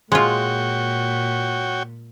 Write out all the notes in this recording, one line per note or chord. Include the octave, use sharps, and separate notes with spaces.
A#2 G#3 F4 F#4 C#5 G5